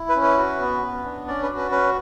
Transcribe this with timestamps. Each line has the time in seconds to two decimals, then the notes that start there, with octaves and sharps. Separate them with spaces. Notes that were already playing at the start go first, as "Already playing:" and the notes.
Already playing: E4
0.09 B4
0.16 C#4
0.23 B4
0.38 F#4
0.61 B3
0.83 B3
1.05 D4
1.27 C#4 D5
1.43 B4
1.50 F#4
1.57 B4
1.71 C#4 B4